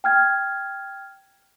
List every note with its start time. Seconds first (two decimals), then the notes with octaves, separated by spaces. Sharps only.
0.04 G5 F6 G#6